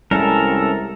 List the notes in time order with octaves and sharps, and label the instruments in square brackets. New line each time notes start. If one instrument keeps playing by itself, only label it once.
[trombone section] C2 [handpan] G3 G#3 E4 [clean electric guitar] C#4 [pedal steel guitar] A4 A#4